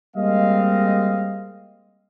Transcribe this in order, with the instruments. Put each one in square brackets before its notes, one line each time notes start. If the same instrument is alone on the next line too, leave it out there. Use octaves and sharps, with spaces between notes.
[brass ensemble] G3 G#3 A#3 C4 D#5 F5